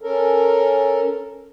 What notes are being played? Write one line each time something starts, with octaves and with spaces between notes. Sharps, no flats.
C#4 A4 A#4